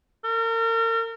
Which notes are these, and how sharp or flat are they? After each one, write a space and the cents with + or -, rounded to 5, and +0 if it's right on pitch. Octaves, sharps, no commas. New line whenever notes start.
A#4 -35